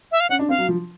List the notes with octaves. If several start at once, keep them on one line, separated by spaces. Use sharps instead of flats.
E5
F5
C#4 F#5
D4
C4 F5
F#3
F3